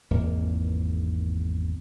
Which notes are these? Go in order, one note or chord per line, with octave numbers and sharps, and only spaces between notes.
G#1 E2 A#3